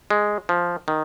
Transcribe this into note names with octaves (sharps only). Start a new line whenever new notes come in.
G#3
F3
D#3